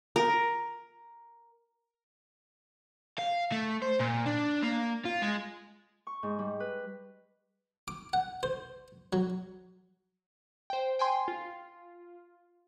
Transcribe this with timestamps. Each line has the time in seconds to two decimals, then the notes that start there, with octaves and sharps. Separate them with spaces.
0.16 A#4
3.19 F5
3.52 A3
3.82 C5
3.99 A#2
4.26 D4
4.63 A#3
5.05 F4
5.22 G#3
6.07 C#6
6.23 G#2
6.39 G3
6.60 B4
7.88 D6
8.13 F#5
8.43 C5
9.13 F#3
10.70 C5 G5
10.99 G5 G#5 C6
11.28 F4